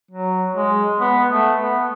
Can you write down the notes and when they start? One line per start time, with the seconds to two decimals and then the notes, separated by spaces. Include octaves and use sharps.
0.11 F#3
0.55 G#3
1.00 B3
1.30 A3
1.59 B3